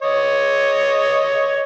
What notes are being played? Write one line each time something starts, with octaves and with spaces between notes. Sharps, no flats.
C#5 D#5